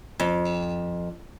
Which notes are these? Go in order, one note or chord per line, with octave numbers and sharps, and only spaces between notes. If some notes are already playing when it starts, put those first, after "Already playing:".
F2